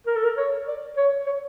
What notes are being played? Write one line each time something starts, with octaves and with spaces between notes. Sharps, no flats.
A#4
A4
A#4
C#5
D5
C#5
C#5